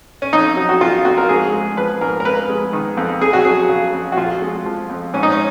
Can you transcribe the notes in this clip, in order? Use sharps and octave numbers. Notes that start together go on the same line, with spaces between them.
C#4
F2 D#4
F#3
F#4
C#3 F4
F2 F#4
A#4
G#2 G#4
G#3
F3 B4
G#2 A#4
A#4
F2 B4
G#3
D#3
F2
F2 G#4
F#4
F#3 G#4
C#3
F2
F#4
F2 F4
G#3
F3
F2
G#2 C#4
D#4
C#4